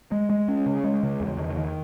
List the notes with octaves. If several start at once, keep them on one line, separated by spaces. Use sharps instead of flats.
G#3
G#3
C#4
C#3
G#3
C#3
E2
D#3
D#3